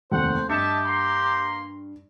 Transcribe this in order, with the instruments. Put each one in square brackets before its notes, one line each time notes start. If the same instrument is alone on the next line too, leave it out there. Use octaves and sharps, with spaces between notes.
[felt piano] F1 D#2 [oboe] C5 [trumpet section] F#5
[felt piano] G2 C#7 [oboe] G4 [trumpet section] D#5 E5 A5
[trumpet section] A#3 A#5 C6